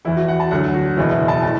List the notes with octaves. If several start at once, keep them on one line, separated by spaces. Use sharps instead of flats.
E2 E3 E4
F#4
F#5
A5
D2 D3 F#3 F#5
F#4
F#1 E2 B2 E4
E5
A5
A2 A5